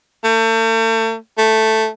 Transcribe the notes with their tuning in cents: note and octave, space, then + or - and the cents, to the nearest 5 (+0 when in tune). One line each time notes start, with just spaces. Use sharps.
A3 +40
A3 +0